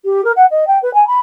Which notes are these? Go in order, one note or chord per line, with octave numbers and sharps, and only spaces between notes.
G4
A#4
F#5
D#5
G5
B4
G#5
B5